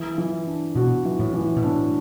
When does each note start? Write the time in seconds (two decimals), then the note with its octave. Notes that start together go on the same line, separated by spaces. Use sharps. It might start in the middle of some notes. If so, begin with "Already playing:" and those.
Already playing: E3
0.18 E3
0.47 D4
0.75 B2 F#4
1.05 E3
1.20 A2
1.34 E3
1.57 B2
1.63 A2 D4